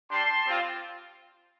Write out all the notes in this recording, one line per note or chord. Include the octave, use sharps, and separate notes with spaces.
G3 D4 G4 A5 C6
G3 C4 F4